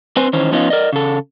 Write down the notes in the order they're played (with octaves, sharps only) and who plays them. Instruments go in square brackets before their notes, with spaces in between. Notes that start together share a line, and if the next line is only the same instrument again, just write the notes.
[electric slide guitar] C4 B4 C5 G#5
D#3 E3 C#4 C5
F3 B3 C#4 D#4 F4
A#4 D5 D#5
C#3 A4